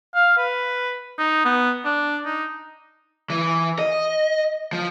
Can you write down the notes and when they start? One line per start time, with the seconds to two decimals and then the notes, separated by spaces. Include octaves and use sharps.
0.15 F5
0.38 B4
1.18 D#4
1.45 B3
1.85 D4
2.25 D#4
3.30 E3
3.79 D#5
4.73 F3